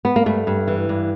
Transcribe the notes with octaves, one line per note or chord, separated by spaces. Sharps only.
B3
A#3
G2 A3
G2
E3
G2